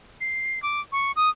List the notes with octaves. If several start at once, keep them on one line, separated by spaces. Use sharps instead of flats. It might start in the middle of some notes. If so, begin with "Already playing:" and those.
C7
D6
C#6
D#6